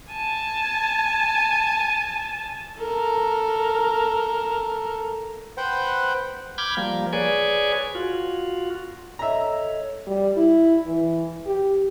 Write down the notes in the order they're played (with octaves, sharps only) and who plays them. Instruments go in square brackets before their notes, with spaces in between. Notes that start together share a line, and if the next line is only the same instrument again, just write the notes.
[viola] G#5 A5
[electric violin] A4 A#4
[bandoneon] B4 C5 F#5 G5
[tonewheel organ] B5 D6 F6 G6 G#6
F3 G3 A#3
G#4 B4 C#5 D5 G#5
F4 F#4
[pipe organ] A4 C#5 D#5 [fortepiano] E5 A#5
[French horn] G3
E4
E3
G4